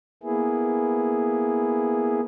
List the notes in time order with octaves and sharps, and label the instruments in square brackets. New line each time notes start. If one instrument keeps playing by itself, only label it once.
[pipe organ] A#3 B3 E4 G#4